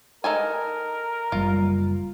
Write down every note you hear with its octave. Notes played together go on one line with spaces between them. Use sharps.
D#4 A4 A#4 G#5
F#1 G3 F4